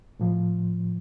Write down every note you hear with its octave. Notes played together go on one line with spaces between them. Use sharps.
A2 F3